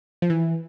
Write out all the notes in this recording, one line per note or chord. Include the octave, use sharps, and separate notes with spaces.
F3
E3